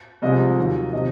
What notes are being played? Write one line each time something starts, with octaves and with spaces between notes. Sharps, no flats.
C2 C3 F3 G#3 D#5
D#2 D#3 F#3
C3 F3 D#5